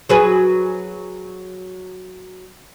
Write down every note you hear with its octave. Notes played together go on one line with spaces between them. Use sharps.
F#3 G#4 B4